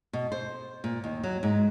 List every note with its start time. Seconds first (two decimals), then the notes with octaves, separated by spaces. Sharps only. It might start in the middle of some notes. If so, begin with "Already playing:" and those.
0.13 B2
0.32 C5
0.84 A#2
1.04 D#2
1.23 F#3
1.43 G#2